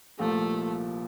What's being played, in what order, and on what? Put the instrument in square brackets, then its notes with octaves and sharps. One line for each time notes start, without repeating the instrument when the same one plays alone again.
[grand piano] C2 A#2 F3 [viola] A3